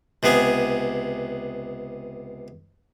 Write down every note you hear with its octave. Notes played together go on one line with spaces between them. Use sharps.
C#2 C3 B3 G#4 G#5